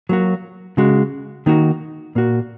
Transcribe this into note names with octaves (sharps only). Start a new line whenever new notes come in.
F#3 A#3 F#4
C#3 G#3 F#4
D#3 A#3 D#4 F#4
A#2 A#3 F#4